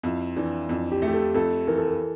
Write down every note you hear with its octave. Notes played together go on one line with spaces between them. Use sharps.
F2 E4
E3 D4
F2
G4
A3
G4
A4
F2 A4
E3 A#4
A4
A#4